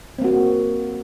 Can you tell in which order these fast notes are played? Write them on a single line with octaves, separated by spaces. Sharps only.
C4 A#3 F#4